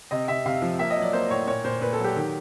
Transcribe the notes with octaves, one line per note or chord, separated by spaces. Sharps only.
C3 D#5
C3 E5
C3 F5
F3
A#3 E5
D#5
F#3
D5
A#3 C5
A2 C#5
A#2 C#5
A#2 C5
A#2 B4
A4
F#3
G4
D#3